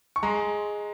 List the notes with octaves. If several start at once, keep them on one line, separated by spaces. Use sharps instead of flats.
C#6
G#3 A#5 C6